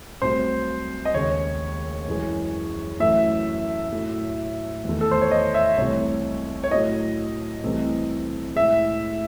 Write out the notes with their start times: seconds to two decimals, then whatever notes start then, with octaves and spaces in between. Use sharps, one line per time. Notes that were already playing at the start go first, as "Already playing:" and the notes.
0.22 C2 C3 F#3 A3 C5
1.05 D#5
1.14 D#2 C#3 G#3 C#5
2.08 F#2 E3 G#3
3.00 F#2 E3 A3 E5
3.93 A2 F#3 A3
4.85 E2 D#3 A3
5.01 A4
5.11 C5
5.21 C#5
5.31 D#5
5.54 E5
5.77 C2 C3 E3 A3 C#5
6.64 C#5
6.71 A2 F#3 A3 D#5
7.64 C2 C3 E3 A3
8.56 A2 G#3 E5